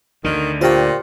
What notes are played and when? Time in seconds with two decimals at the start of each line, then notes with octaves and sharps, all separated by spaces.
0.24 D2 D3 D#3
0.61 A#2 F4 G4 C5 G5 C#6